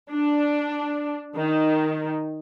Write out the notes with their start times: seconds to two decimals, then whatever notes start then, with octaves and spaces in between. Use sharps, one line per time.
0.11 D4
1.36 D#3